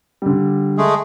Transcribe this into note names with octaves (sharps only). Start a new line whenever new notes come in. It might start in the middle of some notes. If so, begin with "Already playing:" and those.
D3 G3
G#3 A3 G#4